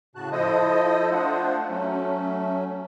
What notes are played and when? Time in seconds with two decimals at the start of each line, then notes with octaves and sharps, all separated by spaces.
0.16 A2 C#3 F#4 A5 F#6
0.32 F3 E4 A4 C5 D#5 D#6
1.11 A3 D4 F4 C5 F#5
1.69 F#3 A3 C#4